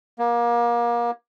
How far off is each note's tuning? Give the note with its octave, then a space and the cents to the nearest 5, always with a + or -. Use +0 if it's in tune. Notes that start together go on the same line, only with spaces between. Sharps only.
A#3 +30